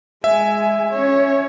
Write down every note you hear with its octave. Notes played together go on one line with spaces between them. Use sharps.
G#3 E5 G#5
C#4 C#5